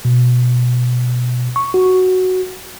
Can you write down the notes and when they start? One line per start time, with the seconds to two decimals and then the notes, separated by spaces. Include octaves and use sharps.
0.05 B2
1.56 C#6
1.74 F#4